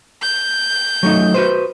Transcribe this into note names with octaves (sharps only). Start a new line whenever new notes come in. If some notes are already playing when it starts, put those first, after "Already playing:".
G6
F#3 A3 D#4
F#4 B4 C5